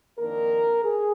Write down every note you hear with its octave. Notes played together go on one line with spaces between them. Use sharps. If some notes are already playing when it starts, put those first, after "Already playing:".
F2 D#3 A#3 D4 A#4
G#4